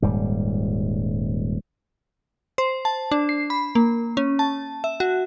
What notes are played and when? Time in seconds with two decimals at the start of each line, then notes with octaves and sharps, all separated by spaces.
0.02 D#1 G#2 G3
2.58 C5
2.85 A5
3.11 D4
3.29 C7
3.50 B5
3.75 A#3
4.17 C#4
4.39 A5
4.84 E5
5.00 F#4